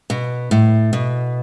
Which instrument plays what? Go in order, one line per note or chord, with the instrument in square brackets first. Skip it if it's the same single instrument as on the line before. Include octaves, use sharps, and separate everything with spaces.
[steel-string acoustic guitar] B2
A2
B2